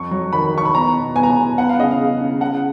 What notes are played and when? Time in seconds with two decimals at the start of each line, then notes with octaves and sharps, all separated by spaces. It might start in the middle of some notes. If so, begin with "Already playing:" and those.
Already playing: F2 C#6
0.11 F#3
0.33 D#3 B5
0.54 D#3 C#6
0.66 B5
0.75 B3 A#5
0.95 B2
1.16 B3 G#5
1.23 A#5
1.30 G#5
1.37 B2
1.57 B3 F#5
1.69 F5
1.79 C#3 D#5
1.91 F5
2.00 C#3
2.21 C#3
2.41 C#3 F#5